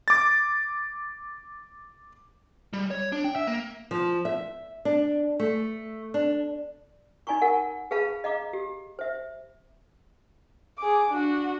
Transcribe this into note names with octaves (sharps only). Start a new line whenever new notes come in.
D6 A6
G3
C#5
D4
G5
E5
A#3
F3
E5
D4
A3
D4
D#4 D5 G#5 A#5 C#6
A#4 F#5 G#5
G#4 B4 F5 A5 B5
D#5 F5 A#5 D6
G4
C5 E5
G#4 D6
D4 F#4